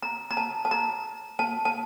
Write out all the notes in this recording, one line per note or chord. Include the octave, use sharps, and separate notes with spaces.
A#5
A#5
A5
A5
A#5
A5
A5